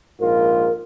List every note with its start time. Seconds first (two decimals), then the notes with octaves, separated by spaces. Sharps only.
0.20 A#1 G#2 F4 A#4